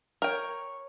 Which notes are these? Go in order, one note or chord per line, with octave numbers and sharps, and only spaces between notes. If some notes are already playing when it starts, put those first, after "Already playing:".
A#4 C#5 G5